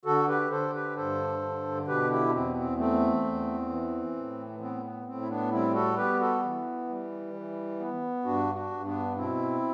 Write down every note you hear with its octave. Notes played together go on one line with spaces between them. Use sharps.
D3 F#4 A4
G4 B4
D3 A4 C5
G4 B4
G2 A4 C5
D3
B2 G4 B4
E4 G4
D4
E2 C4
C4
A3 C4
E2
E3
A2
B3 C4
B3
A2 C4
E4
B3 D4
G3 C4 E4
F#4 A4
B3 G4 B4
F#4 A4
E3
G3
E3
B3
G2 D4 F#4
D4 F#4
G2
B3 D4
B2 C4 E4